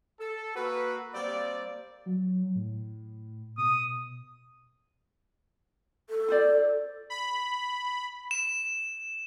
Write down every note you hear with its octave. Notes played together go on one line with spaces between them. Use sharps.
A4
A#3 F#4 A4 B4
G3 A#3 C4 D5
F#3
A2
B2 D#6
A4
F4 C5 D5
B5
E7